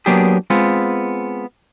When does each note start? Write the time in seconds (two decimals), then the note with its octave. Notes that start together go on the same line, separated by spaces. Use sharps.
0.06 F#3 A#3 B3 D4 G4 G#4
0.50 G#3 B3 C4 F4